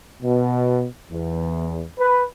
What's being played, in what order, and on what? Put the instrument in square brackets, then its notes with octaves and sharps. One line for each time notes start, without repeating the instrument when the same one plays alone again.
[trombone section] B2
E2
B4